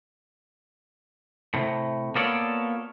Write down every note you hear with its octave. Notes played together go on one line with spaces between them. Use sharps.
A2 C3
A#3 B3 F4 A4 C#5 D5